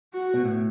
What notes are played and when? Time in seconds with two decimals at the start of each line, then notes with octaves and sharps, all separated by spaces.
0.13 F#4
0.34 B2
0.45 A2